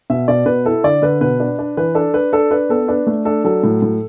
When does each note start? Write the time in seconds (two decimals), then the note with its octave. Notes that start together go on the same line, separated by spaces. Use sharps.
0.10 B2 E5
0.28 B2 D5
0.46 B2 B4
0.66 E4 A4
0.84 D3 D5
1.02 D3 B4
1.21 B2 B4
1.40 D4
1.59 D4
1.77 E3 B4
1.95 D4 A4
2.14 D4 B4
2.33 D4 A4
2.51 D4 B4
2.69 B3 A4
2.88 D4 B4
3.07 A3
3.25 D4 A4
3.44 F#3 A4
3.63 A2
3.82 A2